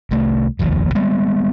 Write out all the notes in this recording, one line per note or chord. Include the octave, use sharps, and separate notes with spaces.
C2 A3
F1 A#1 D#2 A#2
G3 G#3 B3